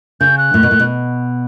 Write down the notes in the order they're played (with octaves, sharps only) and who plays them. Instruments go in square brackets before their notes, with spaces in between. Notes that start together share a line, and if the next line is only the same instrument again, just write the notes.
[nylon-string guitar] C#3 [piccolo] G6
[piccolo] F#6
[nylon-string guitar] A2
B2
A2
B2